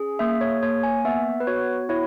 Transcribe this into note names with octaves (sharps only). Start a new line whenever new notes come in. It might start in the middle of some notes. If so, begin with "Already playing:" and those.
Already playing: C#4 G#4
A#3 E5
C#5
A#3 C#5
G#5
B3 E5
B4
F#4 C#5
E4 C#5